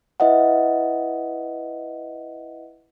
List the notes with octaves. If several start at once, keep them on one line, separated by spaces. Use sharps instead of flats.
E4 B4 D#5 E5 F#5